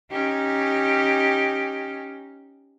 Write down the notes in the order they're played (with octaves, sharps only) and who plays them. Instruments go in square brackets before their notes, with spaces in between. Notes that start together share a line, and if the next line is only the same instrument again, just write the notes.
[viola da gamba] C#4 D#4 G4